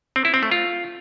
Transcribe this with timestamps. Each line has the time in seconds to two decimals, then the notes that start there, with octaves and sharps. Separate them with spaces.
0.16 C4
0.25 E4
0.34 C4
0.43 A3
0.52 F4